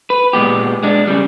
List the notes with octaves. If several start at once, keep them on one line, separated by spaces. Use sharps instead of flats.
B4
A#2 G#3 B3 G4
G#3 D4
C#3 G3